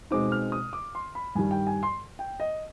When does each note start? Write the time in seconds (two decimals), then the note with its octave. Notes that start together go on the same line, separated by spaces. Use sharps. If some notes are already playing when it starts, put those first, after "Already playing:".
0.11 B2 G#3 C4 D#4 D6
0.32 F6
0.52 D#6
0.73 D6
0.95 C6
1.15 B5
1.35 G2 D#3 G3 G#5
1.51 G5
1.67 G#5
1.83 C6
2.19 G5
2.40 D#5